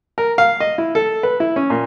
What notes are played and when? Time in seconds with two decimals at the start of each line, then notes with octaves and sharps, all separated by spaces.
0.18 A#4
0.38 F5
0.60 D#5
0.78 E4
0.95 A4
1.23 B4
1.40 E4
1.56 C#4
1.70 A#2